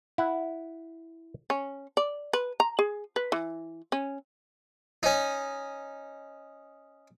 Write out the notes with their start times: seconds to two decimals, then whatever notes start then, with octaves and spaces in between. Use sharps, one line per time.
0.18 E4 F#5
1.50 C#4
1.97 D5
2.33 B4
2.60 A#5
2.79 G#4
3.16 B4
3.32 E3
3.92 C#4
5.03 C#4 D#4